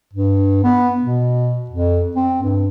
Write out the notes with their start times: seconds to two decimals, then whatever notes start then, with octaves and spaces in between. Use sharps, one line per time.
0.13 G2
0.64 B3
1.02 B2
1.70 F2
2.16 C4
2.42 G2